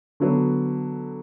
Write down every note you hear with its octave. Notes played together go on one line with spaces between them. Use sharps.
D3 F#3 B3